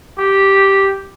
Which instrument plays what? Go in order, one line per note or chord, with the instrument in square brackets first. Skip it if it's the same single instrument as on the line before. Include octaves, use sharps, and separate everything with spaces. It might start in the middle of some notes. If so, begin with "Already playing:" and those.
[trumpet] G4